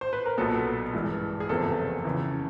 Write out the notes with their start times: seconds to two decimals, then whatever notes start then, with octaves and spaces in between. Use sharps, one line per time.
0.01 C5
0.13 B4
0.26 A#4
0.38 B1 A#2 F#3 B3 A4
0.94 G#1 G2 E3 G#3
1.40 G#4
1.49 F#1 E2 C3 F3 A4
2.04 F2 C#3 E3